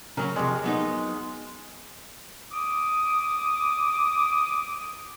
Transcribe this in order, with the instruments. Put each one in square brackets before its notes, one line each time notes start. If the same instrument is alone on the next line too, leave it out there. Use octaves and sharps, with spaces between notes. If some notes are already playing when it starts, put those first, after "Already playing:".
[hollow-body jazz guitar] C#3 F#3 C#4 [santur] A#4
[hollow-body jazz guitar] F2 C3 [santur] G#3
[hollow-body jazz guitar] F#3 B3 D#4
[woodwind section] D6 D#6